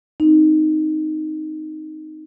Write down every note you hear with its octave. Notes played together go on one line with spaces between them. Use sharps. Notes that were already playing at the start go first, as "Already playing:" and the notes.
C4 D#4